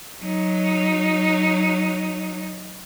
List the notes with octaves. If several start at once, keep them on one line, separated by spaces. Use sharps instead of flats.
F#3 D#4